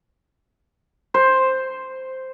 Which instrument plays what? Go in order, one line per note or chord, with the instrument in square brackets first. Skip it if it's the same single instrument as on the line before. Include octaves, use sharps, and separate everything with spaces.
[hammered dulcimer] C5